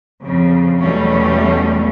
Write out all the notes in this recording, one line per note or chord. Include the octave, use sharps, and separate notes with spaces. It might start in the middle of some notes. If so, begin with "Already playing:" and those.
F2 C#3
E2 B2 F#3 G3 A3 C#4